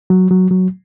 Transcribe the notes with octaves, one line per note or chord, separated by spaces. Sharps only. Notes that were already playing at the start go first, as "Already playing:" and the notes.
F#3
F#3
F#3